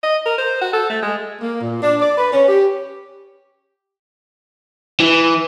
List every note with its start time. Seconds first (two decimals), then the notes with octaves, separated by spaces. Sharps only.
0.03 D#5
0.26 A#4
0.38 C5
0.61 F#4
0.73 A4
0.90 A3
1.02 G#3
1.41 A#3
1.61 A#2
1.82 D4
2.00 D5
2.18 B4
2.32 C#4
2.48 G4
5.00 E3